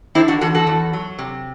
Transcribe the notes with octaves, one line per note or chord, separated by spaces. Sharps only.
D3 C4 E4
D4 F#4
E2 F#4 A4
F#4 A4
E2
F#3
C3